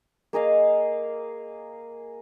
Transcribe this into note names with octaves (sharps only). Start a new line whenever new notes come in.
A#3 G#4 D#5 F5